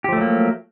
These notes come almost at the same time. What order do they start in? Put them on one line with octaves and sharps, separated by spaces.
G4 F3 A3 F#3 A#3